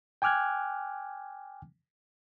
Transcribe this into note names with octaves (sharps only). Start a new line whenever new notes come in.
G5 G#5 D6 F6 F#6 G#6